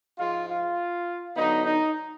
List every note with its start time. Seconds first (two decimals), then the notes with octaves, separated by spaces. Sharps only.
0.18 G#2 F3 G#3 F4
0.47 F4
1.35 D3 F#3 B3 D#4
1.65 D#4